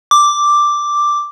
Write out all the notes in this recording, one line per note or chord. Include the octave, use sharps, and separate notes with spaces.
D6